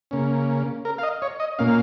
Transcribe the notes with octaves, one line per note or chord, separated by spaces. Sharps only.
C#3 A#3 C#4
A#4
F5
D#5
C#5
D#5
A#2 A#3 C#4 F5